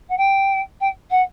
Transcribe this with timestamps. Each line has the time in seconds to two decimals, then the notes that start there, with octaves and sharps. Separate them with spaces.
0.09 F#5
0.17 G5
0.80 G5
1.10 F#5